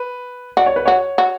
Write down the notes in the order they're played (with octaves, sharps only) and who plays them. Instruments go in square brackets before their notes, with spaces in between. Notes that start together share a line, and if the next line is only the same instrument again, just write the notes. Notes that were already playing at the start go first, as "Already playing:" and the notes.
Already playing: [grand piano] B4
[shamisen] F#4 [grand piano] D5
[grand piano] C#5
B4
[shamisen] F#4 [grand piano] C#5
[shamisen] F#4